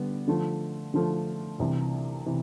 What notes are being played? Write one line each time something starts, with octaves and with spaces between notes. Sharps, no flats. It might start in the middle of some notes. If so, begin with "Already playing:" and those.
Already playing: D3 G3 B3
D3 F3 A3
D3 F3 A3
C2 C3 E3
C3 E3